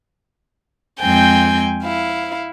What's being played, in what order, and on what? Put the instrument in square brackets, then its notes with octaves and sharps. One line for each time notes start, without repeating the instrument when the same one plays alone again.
[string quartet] F2 G#3 C4 G5 G#5 G6
E4 F5